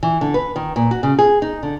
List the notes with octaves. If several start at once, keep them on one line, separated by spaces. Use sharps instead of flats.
E3
D3
B4
D#3
A#2
F#4
C#3
G#4
D#4
D3